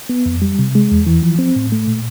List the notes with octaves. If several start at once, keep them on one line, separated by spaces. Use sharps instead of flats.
B3
F2
G3
C3
G#3
E2
E3
F3
C4
A2
A3
A#2